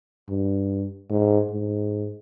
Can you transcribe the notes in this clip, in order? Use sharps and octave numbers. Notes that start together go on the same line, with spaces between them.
G2
G#2
G#2